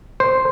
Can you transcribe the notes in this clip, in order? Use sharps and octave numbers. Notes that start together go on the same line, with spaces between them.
C5